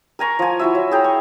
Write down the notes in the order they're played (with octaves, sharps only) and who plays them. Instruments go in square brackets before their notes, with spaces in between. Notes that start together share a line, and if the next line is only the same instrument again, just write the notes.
[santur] A#4 G#5 A#5 C#6
F3 G#5
E4 F#4 E5
F#3
G#4 G5 A#5
C#6